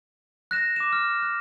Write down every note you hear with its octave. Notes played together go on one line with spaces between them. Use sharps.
F#6 A#6 E7
D6 E7
F6
F#6